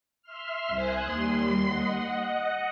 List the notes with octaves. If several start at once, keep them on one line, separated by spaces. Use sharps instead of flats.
E5 C6 F6
C2 C5 G#5 D#6 F#6
D#2 G3 C6
D#5 F#5